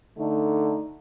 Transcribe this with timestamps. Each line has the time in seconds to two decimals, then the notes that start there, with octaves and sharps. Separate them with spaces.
0.18 D3 A3 D#4